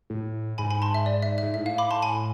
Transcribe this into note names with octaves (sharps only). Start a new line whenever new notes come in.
A2
G#2 G#5 B5
G#5 B5
A5 C6
E5
D5
E5
E5
G#2
A2 E5
F5
B5 D6
A5 C6
G#5 B5